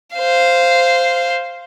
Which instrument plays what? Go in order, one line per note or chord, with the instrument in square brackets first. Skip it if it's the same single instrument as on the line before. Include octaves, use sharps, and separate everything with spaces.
[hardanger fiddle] C5 F5